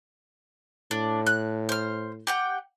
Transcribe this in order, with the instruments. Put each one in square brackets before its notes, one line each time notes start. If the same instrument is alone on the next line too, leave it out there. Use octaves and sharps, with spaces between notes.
[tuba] A2 [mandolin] D4
[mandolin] F#6
C5 F6
G4 F#5 G5